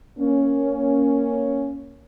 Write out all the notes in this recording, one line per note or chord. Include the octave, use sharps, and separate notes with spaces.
A#3 C#4